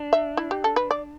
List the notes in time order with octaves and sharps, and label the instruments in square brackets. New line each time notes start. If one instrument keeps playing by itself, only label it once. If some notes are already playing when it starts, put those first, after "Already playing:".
Already playing: [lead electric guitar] D4
[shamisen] E5
E4
G4
A4
B4
D5